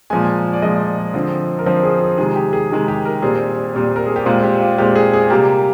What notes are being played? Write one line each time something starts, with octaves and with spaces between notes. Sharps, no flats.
A#2 F3 G#3 G#5
D5
A#2 F3 G#3 D#5
D3 F3 C4
A#4
D3 F3 C4 C5
G#4
G#4
C3 D#3 G#3 G#4
G4
G#4
C3 D#3 G#3
G4
A#4
A#2 G3 C4 G#4
A#2 G3 C4
A#4
G#4
G4
A#2 G#3 C4 F4
G4
F4
A#2 G#3 C4 G4
G#4
G#4
C3 G3 A#3 G4